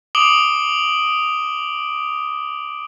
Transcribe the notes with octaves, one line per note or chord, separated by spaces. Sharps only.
D6 D#6 D7 F#7 G7